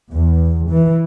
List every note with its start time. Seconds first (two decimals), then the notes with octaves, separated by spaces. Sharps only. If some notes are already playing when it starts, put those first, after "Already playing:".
0.14 E2
0.70 E3